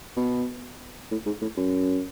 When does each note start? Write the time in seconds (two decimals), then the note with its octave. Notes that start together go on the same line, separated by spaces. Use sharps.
0.17 B2
1.11 A2
1.26 G#2
1.42 A2
1.57 F#2